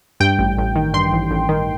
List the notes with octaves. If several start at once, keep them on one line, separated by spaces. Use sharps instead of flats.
G2 G5
A1
A1
D#3
G2 C6
A1
A1
D#3